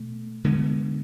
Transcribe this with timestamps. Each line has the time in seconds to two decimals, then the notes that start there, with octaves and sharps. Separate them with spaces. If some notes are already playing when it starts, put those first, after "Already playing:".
Already playing: B2 A3
0.44 D3 G#3 B3